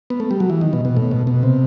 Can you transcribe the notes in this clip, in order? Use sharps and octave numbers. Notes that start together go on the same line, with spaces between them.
B3
A3
G3
F#3
E3
D#3
B2
B2
A2
B2
B2
C3